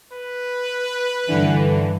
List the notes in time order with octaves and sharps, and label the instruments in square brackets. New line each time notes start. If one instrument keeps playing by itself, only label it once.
[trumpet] B4
[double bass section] G2 [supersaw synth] D3 E3